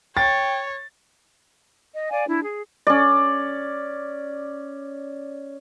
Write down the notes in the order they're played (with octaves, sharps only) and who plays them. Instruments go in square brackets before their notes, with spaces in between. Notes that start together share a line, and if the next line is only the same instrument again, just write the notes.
[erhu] C#5 [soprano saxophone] G5 [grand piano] A6
[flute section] D#5
D5 F5 G#5
D4 E4
G#4
[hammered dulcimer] C#4 D5